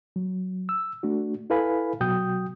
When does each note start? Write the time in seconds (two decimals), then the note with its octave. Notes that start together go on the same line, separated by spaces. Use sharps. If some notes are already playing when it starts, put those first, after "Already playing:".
0.16 F#3
0.69 E6
1.03 A3 D4 F#4
1.50 E4 A4 B4 F5 G#5 B5
2.01 B2 F#3 F#4 G5 D#6 G6